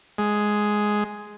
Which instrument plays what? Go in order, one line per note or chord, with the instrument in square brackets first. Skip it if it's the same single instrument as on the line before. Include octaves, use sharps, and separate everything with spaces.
[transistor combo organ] G#3